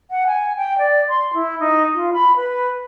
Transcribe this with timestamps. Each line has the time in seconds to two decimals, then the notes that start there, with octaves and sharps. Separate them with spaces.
0.10 F#5
0.27 G#5
0.57 G5
0.78 D5
1.09 C6
1.34 E4
1.60 D#4
1.95 F4
2.13 B5
2.36 B4